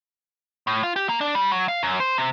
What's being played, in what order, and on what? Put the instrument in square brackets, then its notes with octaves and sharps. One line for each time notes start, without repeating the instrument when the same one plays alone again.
[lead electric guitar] A2
F4
G4
A#3
D4
G3
F#3
F5
F#2
C5
C3